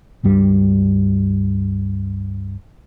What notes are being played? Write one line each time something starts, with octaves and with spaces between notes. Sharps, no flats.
C#2 G2 G3